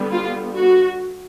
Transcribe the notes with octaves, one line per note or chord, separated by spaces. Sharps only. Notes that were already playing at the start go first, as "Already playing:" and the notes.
Already playing: D3 G3 B3
F4
F#4